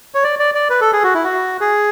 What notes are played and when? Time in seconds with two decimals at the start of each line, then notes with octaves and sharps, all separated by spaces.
0.15 C#5
0.24 D5
0.39 D5
0.55 D5
0.70 B4
0.81 A4
0.93 G#4
1.04 F#4
1.15 E4
1.24 F#4
1.61 G#4